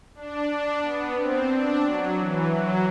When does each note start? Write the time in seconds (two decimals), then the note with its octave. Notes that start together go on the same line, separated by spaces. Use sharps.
0.15 D4
0.48 D4
0.82 B3
1.16 C4
1.49 D4
1.83 F#3
2.17 E3
2.50 F#3